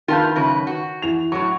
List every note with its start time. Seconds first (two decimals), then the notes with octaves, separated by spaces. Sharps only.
0.08 D#3 F4 B4 F5 A5 G6
0.36 F#2 C#3 B4
0.67 F#4
1.02 E3 F7
1.32 A2 F#3 C#6